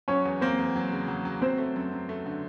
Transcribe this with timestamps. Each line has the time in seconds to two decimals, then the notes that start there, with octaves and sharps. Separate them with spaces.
0.08 F#3 C#4 C#5
0.25 E2
0.41 A#3 C4 C5
0.58 E2
0.76 F#3
0.92 C#3
1.08 F#3
1.25 F#3
1.42 F#3 C4 C5
1.58 A3
1.76 F#2
1.92 F#2
2.09 A3
2.26 D3